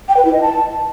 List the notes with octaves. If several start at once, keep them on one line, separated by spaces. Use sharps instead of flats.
G5
B4
E4
D#5
A5